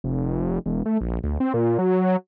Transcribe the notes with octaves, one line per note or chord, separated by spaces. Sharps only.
F1
E1
A3
A#1
D2
C4
A#2
F#3